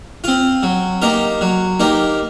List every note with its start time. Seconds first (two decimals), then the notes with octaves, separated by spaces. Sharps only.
0.24 C4 F4
0.63 F#3
1.02 A#3 D#4 G4 A#4
1.41 F#3
1.80 A#3 D#4 G4 A#4